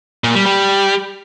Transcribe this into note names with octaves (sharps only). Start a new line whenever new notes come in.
A#2
G3
G3